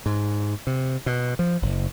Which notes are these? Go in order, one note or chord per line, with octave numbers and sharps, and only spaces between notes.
G#2
C3
B2
F3
F#1